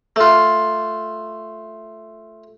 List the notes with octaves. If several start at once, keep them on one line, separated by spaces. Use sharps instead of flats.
A3 F4